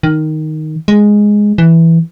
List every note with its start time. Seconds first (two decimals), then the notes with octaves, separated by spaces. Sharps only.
0.03 D#3
0.88 G#3
1.58 E3